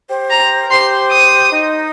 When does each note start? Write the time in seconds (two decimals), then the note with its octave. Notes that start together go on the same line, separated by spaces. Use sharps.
0.09 G4 C5
0.30 A#5
0.61 A#4
0.71 G4 C5 C6
1.11 D#6
1.52 D#4